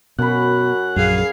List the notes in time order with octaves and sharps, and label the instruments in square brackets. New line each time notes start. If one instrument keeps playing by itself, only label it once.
[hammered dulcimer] F#2 B5 [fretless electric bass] B2 [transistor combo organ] F#5
[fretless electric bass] A#1 F#2 [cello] G#4 F5